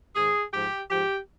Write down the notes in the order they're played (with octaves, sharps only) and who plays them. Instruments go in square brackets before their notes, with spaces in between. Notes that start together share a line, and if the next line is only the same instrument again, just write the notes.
[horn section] G#2 D#3 G#4
G#2 F3 G4
G#2 F3 G4